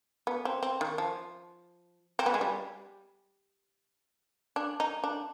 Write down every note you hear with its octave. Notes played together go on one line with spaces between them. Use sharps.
B3
C4
C4
D#3
F3
C4
B3
G#3
G3
D4
D#4
D4